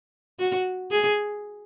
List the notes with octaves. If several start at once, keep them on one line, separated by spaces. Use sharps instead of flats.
F#4
G#4